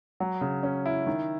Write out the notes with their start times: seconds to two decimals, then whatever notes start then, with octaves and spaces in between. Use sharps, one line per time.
0.20 F#3
0.41 C#3
0.63 C#4
0.86 E4
1.07 D#3